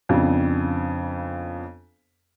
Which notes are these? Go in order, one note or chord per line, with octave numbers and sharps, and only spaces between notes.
F2 C#3 B3 D4